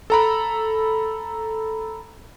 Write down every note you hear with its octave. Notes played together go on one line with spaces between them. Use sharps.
A4 A#5 B5